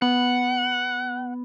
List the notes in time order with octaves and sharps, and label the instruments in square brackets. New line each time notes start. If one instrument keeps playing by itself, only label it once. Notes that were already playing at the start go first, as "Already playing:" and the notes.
[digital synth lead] B3 [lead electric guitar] F#5